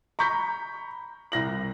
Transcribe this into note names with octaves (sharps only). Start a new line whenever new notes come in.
A#5 B5 C#6 G6 B6
C2 A#6 F#7